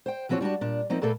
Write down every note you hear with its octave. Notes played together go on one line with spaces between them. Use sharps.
C5 G5
E3 F3 C4 F#4 C#5
G3 D4 F#4 A5
A#2 D4
F3 A#3 C4 D#4
A#2 A3 A#3 A4 B4